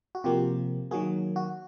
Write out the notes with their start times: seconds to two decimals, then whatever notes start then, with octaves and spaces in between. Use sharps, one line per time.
0.15 F#4
0.24 C3 F3 A#3 F4 G4
0.91 D#3 F#3 A#3 F#4 G#4
1.36 F#4